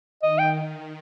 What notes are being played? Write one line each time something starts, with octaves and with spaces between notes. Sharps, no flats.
D#3 D#5
G5